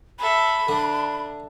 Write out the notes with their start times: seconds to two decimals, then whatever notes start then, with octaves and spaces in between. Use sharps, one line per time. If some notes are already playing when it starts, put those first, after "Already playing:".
0.19 A4 E5 B5
0.69 D3 D4